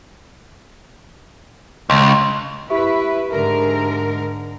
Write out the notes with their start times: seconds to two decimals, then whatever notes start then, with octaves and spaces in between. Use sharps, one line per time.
1.90 C#2
2.70 E4 G4 B4 E5 C#6
3.33 G#2 D3 A#4